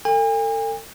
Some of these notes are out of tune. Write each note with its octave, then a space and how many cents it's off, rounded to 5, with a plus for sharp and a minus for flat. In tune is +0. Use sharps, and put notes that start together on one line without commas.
A4 +35 G#5 -45